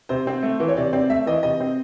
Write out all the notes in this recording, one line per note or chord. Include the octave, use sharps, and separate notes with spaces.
C3 C5
C4
A3
E3
C#5
C3 D5
C4 D5
A3 E5
E3 D#5
C3 D#5
C4